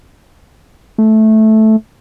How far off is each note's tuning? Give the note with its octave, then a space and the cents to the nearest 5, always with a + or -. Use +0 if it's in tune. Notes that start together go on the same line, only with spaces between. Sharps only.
A3 -10